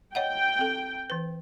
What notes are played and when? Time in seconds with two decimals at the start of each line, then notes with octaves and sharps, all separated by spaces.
0.15 C#5 D#5 F#5 G5
0.59 C4 A4
1.10 E3 B4